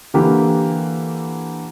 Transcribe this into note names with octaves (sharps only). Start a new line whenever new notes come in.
D3 E3 A#3 G4